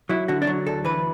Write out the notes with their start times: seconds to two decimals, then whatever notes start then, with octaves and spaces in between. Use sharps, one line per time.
0.09 F#3 E4
0.28 D3 F#4
0.42 D4
0.47 F#3
0.67 D2 A4
0.85 E3 B4